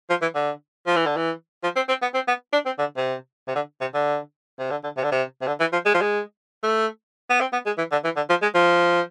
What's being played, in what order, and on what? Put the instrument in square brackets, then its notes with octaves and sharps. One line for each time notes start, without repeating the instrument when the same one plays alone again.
[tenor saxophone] F3
E3
D3
F3
E3
D3
E3
F3
C4
C4
B3
C4
B3
D4
C4
D3
C3
C3
D3
C3
D3
C3
D3
D3
C3
D3
C3
C3
D3
E3
F3
G#3
F3
G#3
A3
B3
C4
B3
G#3
E3
D3
E3
D3
F3
G#3
F3